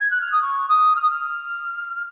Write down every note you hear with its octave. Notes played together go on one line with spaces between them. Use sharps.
G#6
F#6
F6
D#6
C#6
D#6
F6
D#6
F6